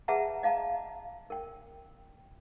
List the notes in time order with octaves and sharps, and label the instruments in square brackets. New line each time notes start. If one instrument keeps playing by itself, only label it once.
[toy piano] G#4 B4 E5 F#5 A5 A#5
D#5 F5 A5 A#5
A#4 G5